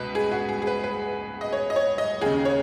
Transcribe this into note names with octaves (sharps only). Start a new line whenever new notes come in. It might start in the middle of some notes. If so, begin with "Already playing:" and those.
Already playing: C#2 B2 B4 D#5
G#4
F#4
G#4
G#4
B4
B4
D#5
C#5
D#5
C#5
D#5
D#2 C#3 G#4
C#5